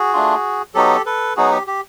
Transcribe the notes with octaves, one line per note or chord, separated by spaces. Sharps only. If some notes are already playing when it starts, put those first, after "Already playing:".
Already playing: F#4 G#4
A3 D4 F4
F#3 B3 D#4 F#4 G4 A4
A4 B4
F#3 B3 D#4 F#4 G#4
G4
G4